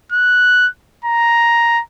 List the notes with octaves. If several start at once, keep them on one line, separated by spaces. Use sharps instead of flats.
F#6
A#5